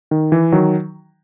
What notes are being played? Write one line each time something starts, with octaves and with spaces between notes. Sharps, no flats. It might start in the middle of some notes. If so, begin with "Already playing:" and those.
D#3
E3
D#3 F#3